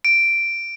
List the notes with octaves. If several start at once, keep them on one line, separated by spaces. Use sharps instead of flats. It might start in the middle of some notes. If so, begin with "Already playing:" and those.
D7